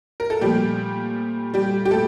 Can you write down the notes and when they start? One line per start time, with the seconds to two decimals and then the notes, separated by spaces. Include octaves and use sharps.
0.20 A#4
0.30 A4
0.41 A#2 F3 G3 A3 G4
1.54 G3 G4
1.85 G4
1.91 A3 A4